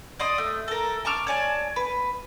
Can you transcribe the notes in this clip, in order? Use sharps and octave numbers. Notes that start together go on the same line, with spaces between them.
D5 D#5 C6 D#6
A3
A4 A#4
A5 C#6 D6 F6
C#5 D5 G#5 A5
B4